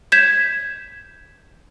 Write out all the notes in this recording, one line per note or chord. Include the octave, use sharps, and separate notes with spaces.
G6 G#6 B6 E7